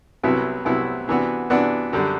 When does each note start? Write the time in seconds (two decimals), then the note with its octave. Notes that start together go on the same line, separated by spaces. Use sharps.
0.23 C2 C3 F#3 B3 E4
0.65 C2 C3 F#3 B3 E4
1.08 C3 E3 B3 D4 F#4
1.50 C3 E3 B3 D4 F#4
1.93 F#2 D3 G3